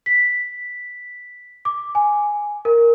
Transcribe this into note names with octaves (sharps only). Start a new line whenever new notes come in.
B6
D6
G#5
A#4